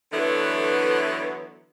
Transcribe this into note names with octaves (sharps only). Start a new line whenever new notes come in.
D3 E3 F#3 A3 B3